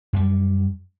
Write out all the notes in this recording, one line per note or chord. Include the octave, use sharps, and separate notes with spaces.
F#2 G3